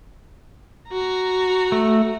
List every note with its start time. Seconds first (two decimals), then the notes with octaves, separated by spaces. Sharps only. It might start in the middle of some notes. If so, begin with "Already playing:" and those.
0.90 F#4 A#5
1.72 A3